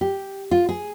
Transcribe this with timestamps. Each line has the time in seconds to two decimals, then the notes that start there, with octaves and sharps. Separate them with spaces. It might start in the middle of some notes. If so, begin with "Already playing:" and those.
0.01 G4
0.51 F4
0.69 G#4